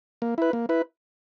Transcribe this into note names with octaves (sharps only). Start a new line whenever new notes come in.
A#3
E4 B4
A#3
E4 B4